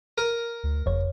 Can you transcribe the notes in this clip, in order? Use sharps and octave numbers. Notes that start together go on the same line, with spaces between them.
A#4 D#7
D2
F#1 F2 C#5